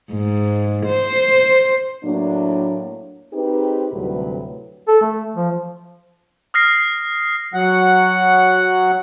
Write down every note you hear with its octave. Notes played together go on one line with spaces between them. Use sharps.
G#2
C5
A2 F#3 A#3 D4
C4 D#4 G4 G#4 B4
D2 A2 C3 F#3 G3 B4
A4
A3
F3
D#6 F6 A#6 C7
F#3 F#5